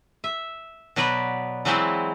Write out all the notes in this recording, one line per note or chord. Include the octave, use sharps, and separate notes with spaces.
E5
B2 F#3 B3 B4 D5
E3 F#3 G#3 C4 E4